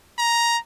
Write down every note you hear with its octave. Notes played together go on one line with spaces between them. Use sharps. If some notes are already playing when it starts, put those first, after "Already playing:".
A#5